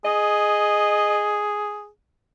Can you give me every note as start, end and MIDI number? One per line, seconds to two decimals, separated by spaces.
0.05 1.88 68
0.05 1.49 75